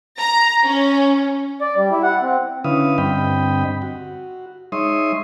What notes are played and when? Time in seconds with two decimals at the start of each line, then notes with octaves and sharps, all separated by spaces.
0.19 A#5
0.65 C#4
1.61 D5
1.76 G3
1.91 E4
2.03 F#5
2.22 C4
2.64 D3 C#4 E4 B4 F5 D#6
2.98 G2 D3 C4 D#5 G5 B5
3.82 F#4
4.72 G#3 D#4 C#5 E5 C6 D#6